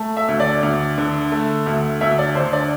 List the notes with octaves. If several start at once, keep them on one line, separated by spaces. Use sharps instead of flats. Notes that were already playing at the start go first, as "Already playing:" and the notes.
Already playing: A3
E5
D2
D5
D2
D3
A3
D2
D2 E5
D5
D3 C5
D5